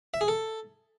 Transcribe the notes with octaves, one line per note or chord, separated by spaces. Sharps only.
E5
G#4
A4